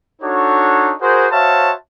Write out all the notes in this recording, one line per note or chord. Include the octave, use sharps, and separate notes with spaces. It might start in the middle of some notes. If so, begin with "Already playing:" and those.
D4 D#4 F#4 A4 C#5
F#4 G#4 A#4 C5
F#4 C5 C#5 E5 F5 A5